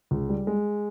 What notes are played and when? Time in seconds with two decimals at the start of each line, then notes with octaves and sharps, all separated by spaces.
0.11 C#2
0.29 G3
0.47 G#3